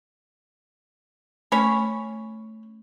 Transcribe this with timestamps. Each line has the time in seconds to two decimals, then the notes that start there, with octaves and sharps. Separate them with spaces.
1.52 A3 C#4 C#5 B5